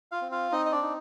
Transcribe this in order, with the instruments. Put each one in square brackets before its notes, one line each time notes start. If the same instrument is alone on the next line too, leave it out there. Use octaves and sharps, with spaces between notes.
[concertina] F4 F5
C4
F4 F5
C4 D#4 D#5
D#5
D4 D5
D#4